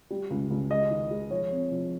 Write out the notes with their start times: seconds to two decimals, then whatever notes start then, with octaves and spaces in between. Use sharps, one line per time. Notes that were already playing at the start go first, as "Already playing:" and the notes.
0.10 G3
0.30 C#2
0.50 C#2
0.70 G#3 D#5
0.90 D#3
1.11 G#3
1.31 F3 C#5
1.51 C4
1.71 F3